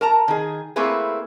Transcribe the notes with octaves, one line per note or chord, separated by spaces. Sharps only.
A#4 A5 A#5
D#3 G#4
A3 A#3 C4 E4 G#4 B4